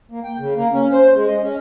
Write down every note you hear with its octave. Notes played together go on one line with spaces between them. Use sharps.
A#3
G5
C#3
A#3
C#4
C5
G#3
D#5
C#4